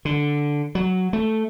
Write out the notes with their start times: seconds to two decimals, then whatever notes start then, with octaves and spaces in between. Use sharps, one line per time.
0.05 D3
0.75 F#3
1.13 A3